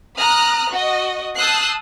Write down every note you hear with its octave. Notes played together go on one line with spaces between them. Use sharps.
A#5 D#6 F6 F#6
F#4 D#5
A5 D#6 E6 F#6 G6 C7